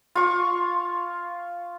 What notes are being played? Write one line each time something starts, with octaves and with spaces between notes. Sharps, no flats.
F4 C#6